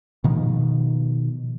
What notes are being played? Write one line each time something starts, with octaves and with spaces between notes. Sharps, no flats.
B2 D#3 F3